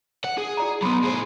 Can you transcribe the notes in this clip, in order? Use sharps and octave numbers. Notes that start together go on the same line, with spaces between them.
F#5
G#4
E4 D5 A#5
F#3 B3 B5 C6
A2 E4 G#4 C5